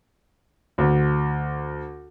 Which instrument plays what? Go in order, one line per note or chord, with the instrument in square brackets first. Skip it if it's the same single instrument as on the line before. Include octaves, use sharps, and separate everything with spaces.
[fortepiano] D2